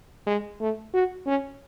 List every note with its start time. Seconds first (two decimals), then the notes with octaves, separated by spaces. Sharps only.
0.26 G#3
0.60 A3
0.93 F#4
1.26 C#4